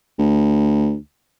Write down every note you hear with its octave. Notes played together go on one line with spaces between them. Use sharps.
D2